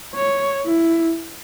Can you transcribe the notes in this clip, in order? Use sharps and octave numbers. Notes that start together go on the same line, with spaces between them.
C#5
E4